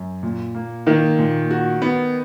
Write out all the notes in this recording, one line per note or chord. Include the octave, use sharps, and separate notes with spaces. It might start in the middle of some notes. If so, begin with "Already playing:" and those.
Already playing: F#2
A#2
A#3
D#3 A#3
A#2
F#4
B3